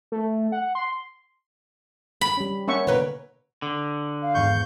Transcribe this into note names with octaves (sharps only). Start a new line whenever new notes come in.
A3
F#5
C6
B5
G3 C#4
A#3 C#4 C#5 E5 F#5 C#6
B2 D3 A#4 B4 C#5
D3
F5
G#1 E2 C#6 G6